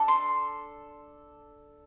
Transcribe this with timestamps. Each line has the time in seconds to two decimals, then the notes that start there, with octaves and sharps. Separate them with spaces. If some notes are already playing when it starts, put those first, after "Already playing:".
Already playing: D4 A4
0.08 C6